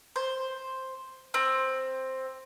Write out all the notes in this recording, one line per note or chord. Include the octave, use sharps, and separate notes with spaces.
C5
C4